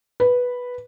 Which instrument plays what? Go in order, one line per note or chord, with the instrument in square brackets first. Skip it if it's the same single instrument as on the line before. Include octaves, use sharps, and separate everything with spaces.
[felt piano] B4